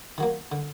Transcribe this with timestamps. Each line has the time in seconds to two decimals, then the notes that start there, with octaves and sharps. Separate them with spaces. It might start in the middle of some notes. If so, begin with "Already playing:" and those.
0.18 D#3 F#3 A#3
0.52 D3